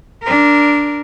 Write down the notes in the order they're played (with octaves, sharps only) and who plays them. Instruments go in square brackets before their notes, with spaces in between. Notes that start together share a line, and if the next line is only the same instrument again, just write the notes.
[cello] D4 A#4